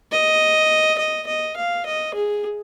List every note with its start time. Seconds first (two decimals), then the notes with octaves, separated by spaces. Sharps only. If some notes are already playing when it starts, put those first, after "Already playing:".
0.12 D#5
0.98 D#5
1.27 D#5
1.56 F5
1.86 D#5
2.15 G#4